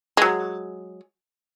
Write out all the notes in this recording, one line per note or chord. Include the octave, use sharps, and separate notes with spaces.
F#3 G#3